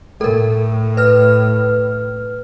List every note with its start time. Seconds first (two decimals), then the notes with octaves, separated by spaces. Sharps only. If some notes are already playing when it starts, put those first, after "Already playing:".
0.21 A2 A4 A#4
0.97 B4 F6